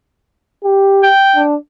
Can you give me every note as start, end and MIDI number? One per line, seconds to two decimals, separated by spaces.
0.64 1.09 67
1.03 1.42 79
1.36 1.56 62